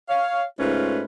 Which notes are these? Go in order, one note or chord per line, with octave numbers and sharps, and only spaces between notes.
C#5 F5
G#2 A3 C#4 F4 B4